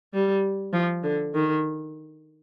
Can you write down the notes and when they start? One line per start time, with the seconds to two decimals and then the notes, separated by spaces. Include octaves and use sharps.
0.14 G3
0.73 F3
1.03 D3
1.34 D#3